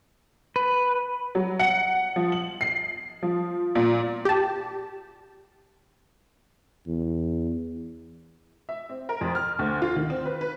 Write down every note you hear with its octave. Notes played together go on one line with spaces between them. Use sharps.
B4
F#3
F#5
F3
F#7
C7
F3
A#2
G4 A5
E2
E5
C4
A#4
F2
F6
D2
F4
D#3
C4
B4
B4